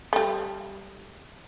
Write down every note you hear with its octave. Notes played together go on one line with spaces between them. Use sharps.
G3 A3